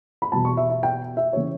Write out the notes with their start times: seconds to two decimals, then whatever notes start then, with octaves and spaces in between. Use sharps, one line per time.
0.22 B5
0.32 E2 B2 G3 A5
0.45 C#6
0.57 E5
0.70 E5
0.83 G5
1.17 E5
1.33 C#3 E3 C#5